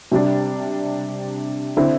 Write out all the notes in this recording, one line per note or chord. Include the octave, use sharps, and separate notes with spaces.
C3 G3 D4
D3 C4 E4